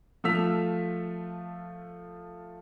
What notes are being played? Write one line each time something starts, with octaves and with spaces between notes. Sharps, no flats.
F3 A3 F4 E6 B6 F7